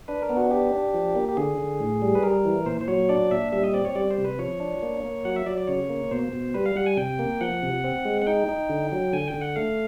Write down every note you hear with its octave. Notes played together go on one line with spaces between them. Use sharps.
D4 B4
A#4
B3
F#4
D4 G4
D4
F3
A#3
G4
D3 G#4
D3
A2
G3
B4
G3 A#4
E3
A#2 C5
C5
F#3 C#5
D4 D5
A#2 E5
G3 E5
D#5
C4 D5
C#5
G3 D5
C5
C3
B4
F3 C#5
D4
A#3
A#3
F#3 F#5
E5
F#3 D5
D5
C#3 C#5
A#3
B2 C5
B2
G3 B4
F5
G3 F#5
G#5
C3 G5
A#3
F3 F#5
C3
C4
G#3
F#5
D#4 G5
D#4
D3
F#3
D3 G#5
G5
D3
F#5
A3 F5